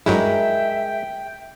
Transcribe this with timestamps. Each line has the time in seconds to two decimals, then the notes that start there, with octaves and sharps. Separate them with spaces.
0.06 G2 F#3 G#3 E4 A#4 E5 G5